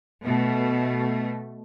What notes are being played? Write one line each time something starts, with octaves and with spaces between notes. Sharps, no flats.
B2 A3